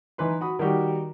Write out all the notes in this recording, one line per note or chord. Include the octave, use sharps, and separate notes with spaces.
E3 D#4 B4 C6
F#4 B5 D#6
D#3 G3 F#4 G4